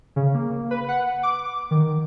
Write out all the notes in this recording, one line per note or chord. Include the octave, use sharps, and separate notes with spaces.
C#3
A#3
B4
F#5
D6
D#3